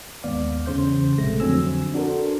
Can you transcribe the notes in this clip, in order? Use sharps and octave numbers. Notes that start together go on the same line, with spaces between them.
D#2 G#2 B3 D5 F5
E2 C#3 C5 G6
A#1 C3 G#3 A3 A#6
F2 D3 F#3 C4 G#5 E6
D4 F#4 A4 A#4 C5